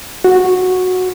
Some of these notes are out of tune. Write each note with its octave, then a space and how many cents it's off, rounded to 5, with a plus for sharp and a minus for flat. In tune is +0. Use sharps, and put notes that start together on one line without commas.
F#4 -10